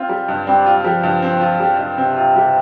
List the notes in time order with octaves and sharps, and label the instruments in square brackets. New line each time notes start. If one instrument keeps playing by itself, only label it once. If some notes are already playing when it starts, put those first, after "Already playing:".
Already playing: [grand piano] C4 F4
G3
G2
[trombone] G3 [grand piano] C4
[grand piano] F4
[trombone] F3 [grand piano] G3
[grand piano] G2
C4
F4
G3
G2
[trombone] C3 [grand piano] C4
[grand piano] F4
G3